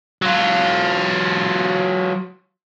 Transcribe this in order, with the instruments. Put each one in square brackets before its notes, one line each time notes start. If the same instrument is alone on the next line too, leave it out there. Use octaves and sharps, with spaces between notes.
[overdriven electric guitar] F#3 F4